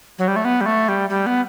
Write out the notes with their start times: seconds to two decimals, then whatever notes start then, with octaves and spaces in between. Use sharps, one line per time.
0.18 F#3
0.28 G3
0.36 A3
0.45 B3
0.61 G3
0.66 A3
0.88 G3
1.09 G3
1.26 B3